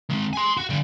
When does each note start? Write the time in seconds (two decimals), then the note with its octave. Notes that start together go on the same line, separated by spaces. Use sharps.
0.10 G#3 C4
0.33 G#5 C6
0.57 F#4
0.70 D3 G3